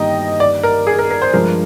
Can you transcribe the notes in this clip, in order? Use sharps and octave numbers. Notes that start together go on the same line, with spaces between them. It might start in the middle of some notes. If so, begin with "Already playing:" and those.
Already playing: G1 G2 D#3 G3 A#3 D#5 G5 A#5
D5
A#4
G#4
A#4
A#4
C5
G2 F3 G#3 D4 F4 A#4